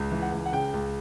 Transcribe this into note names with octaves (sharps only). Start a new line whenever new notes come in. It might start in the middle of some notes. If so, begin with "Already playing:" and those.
Already playing: C#2
E3
F#5
C#2
F#5
C#3 G5
C#2